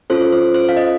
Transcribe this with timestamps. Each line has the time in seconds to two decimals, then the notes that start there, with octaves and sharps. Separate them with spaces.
0.10 C#4 F4 A4 C5
0.32 C5
0.54 C5
0.69 F5
0.77 D#5